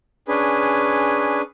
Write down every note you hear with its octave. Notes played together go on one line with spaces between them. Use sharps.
C#4 D4 G#4 B4